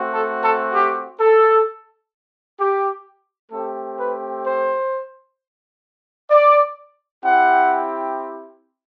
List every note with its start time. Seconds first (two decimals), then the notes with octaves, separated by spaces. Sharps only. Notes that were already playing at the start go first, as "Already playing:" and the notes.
Already playing: A3 C4 F#4
0.12 A4
0.43 A4
0.74 G4
1.20 A4
2.60 G4
3.52 A3 C4 G4 A4
3.99 B4
4.45 C5
6.30 D5
7.23 C4 E4 G4 F#5